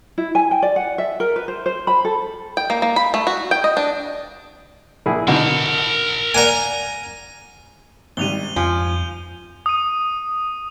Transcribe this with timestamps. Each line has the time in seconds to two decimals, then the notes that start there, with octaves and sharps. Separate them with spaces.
0.18 E4
0.35 G#5
0.51 G5
0.62 D5
0.76 F#5
0.98 E5
1.20 A#4
1.36 B4
1.48 C5
1.66 C5
1.87 B5
2.05 A4
2.57 G5
2.70 A#3
2.82 A#3
2.96 B5
3.14 A3
3.27 F#4
3.51 G5
3.64 D#5
3.77 D4
5.06 A#1 E4 G#4
5.28 B2 D3 D#4 A#4 A5
6.34 A#3 D5 F#5 G#5 A#5
8.17 G#1 G3 D#7 F7 G7
8.56 F2 F3 G#5 G6
9.66 D#6 D#7